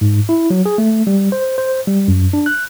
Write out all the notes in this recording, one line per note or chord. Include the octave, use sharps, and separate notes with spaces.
G#2
E4
F#3
G#4
A3
G3
C5
C5
G3
F#2
D4
F#6